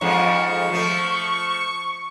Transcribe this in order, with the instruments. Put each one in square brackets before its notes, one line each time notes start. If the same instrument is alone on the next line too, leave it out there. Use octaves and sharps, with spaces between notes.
[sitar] F2 G#2 F3 [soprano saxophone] C#6
[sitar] F3 A3